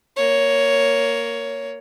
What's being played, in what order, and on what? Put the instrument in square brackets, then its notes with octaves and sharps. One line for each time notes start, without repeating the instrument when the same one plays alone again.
[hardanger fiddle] A#3 C#5